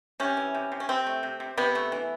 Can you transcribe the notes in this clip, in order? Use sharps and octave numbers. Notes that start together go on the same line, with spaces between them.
C3 C#4
E3
C3
C3
C#4
C3 C4
A3
C3
C3
C3 B3
A3
E3